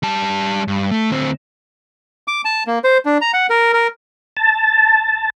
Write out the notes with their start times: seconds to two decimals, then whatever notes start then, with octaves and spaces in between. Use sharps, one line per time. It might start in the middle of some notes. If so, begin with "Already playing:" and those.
0.03 G3 A5
0.68 G2
0.91 A3
1.10 D2 C4
2.28 D6
2.45 A5
2.67 A#3
2.84 C5
3.05 D4
3.21 A#5
3.33 F#5
3.50 A#4
3.74 A#4
4.37 A5